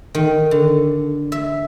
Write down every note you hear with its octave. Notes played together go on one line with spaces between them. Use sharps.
D#3
D3
E5